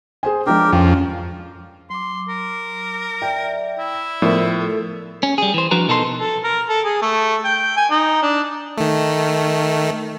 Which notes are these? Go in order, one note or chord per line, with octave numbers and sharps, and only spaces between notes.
G#4 C5 G#5
F3 G#3 D4 G4 A#4 G5
F2 C4 C#4 F5
F#3 C6 D6
A#4
D5 E5 G5
E4
A2 F3 B3 A#4 D5 E5
A4
C#4
G3 G#4
E3 C5
F3 D4 F#4 B4 A#5
B2 D#4 A4 A#4 C#5 C6
A4
A#4
A4
G#4
A3
G5
G#5
D#4
D4
D#3 A3